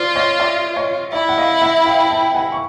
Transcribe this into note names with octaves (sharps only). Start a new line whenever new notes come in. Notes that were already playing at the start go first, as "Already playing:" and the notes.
Already playing: F4 C5 D5
C#5 D#5
D5 E5
C#5 D#5
E4 D5 E5
F#5
D#5 F5
E5 F#5
F5 G5
G5 A5
F#5 G#5
C#6